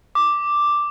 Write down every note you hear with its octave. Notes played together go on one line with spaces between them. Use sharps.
D6